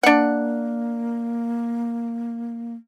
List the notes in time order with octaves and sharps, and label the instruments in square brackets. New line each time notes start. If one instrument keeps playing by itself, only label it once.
[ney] A#3 [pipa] D4 F#5